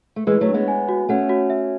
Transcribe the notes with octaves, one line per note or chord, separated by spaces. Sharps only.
A3
E3 G#3 B4
F#3 A3
D4
G#3 B3
G#5
F#4
A3 C#4 F#5
F#4
E5